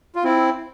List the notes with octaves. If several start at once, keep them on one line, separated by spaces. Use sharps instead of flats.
F4
C4 E4